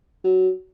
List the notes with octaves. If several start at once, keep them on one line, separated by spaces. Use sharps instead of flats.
F#3